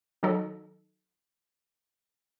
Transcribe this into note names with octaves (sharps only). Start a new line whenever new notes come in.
D#3 F#3 D#4 A4